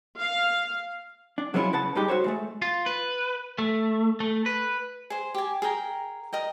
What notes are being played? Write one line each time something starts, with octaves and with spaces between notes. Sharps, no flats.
F5
D4
F#3 G#3 B3 C#4 E4 F4
C#3 B4 F#5 A5
G2 G3 G#3 D#4 G4
F#4 A4 C5 C#5
A2 G#3 A3
F4
B4
A3
A3
B4
G#4 C5
G4 G#5
G#4 A#4 G5 A#5
A#4 D#5 G5